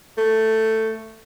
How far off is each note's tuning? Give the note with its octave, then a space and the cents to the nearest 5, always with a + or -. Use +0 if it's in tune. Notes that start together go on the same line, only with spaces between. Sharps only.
A3 +10